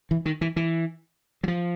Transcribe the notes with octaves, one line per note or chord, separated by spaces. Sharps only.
E3
D#3
E3
E3
F#3
F3